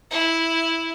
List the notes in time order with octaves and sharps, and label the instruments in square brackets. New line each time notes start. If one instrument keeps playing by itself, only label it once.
[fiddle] E4